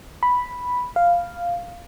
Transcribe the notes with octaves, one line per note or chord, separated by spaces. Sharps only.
B5
F5